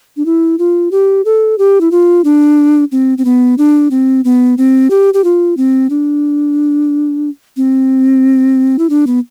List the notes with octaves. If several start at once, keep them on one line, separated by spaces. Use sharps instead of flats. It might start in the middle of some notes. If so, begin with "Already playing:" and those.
D4
E4
F4
G4
A4
G4
E4
F4
D4
C4
C4
B3
D4
C4
B3
C4
G4
G4
F4
C4
D4
C4
E4
D4
B3